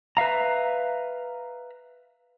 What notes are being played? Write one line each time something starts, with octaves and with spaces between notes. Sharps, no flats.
B4 E5 F5 A#5